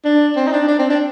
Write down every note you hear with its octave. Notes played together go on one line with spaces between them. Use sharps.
D4
C4
D#4
D4
D4
C4
D4